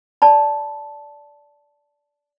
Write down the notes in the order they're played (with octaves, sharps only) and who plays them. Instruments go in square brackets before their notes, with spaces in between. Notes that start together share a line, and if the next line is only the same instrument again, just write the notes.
[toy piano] D5 A5 B5